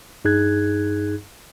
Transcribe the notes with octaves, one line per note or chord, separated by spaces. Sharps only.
G2 D#4 G#4 F#6 G#6